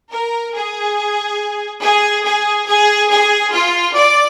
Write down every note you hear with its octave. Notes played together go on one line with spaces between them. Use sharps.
A#4
G#4
G#4
G#4
G#4
G#4
F4
D5